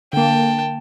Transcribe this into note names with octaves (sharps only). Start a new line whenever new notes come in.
D3 A#3 G5 A5